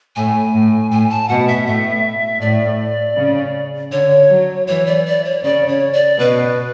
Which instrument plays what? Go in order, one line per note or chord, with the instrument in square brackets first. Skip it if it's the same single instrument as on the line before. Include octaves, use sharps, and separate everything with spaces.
[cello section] A2 [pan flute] G#5
[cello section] A2
[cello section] A2 [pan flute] G#5
[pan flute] A5
[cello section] B2 [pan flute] F#5
[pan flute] E5
[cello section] A2 [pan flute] E5
[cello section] A2 [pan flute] D5
[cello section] C#3
[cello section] D3 [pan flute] C#5
[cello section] F#3
[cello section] E3 [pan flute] C#5
[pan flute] D5
D5
C#5
[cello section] C#3 [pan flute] D5
[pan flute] C#5
D5
[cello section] B2 [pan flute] B4